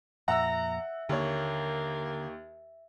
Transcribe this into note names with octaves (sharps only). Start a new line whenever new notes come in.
F2 A#2 E5 F#5 A#5 E6
D#2 D3 A#3 C#5